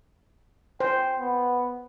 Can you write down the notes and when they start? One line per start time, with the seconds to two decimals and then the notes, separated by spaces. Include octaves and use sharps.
0.80 C5 G5
1.19 B3